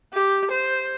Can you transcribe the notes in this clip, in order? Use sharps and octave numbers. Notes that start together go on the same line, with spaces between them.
G4
C5